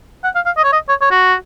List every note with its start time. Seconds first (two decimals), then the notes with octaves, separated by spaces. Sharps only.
0.24 F#5
0.35 F5
0.45 F5
0.57 D#5
0.64 C#5
0.73 D#5
0.89 C#5
1.01 C#5
1.11 F#4